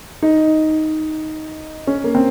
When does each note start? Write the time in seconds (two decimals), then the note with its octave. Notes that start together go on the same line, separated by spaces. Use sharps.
0.22 D#4
1.87 C#4
2.04 A#3
2.15 C4